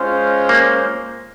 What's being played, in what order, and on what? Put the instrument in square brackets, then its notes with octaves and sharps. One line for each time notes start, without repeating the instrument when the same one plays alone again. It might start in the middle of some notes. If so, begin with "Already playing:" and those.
Already playing: [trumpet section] G#3 C#4 F4 C5
[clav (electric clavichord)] A#3